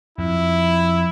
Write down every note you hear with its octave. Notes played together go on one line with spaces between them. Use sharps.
F2 E4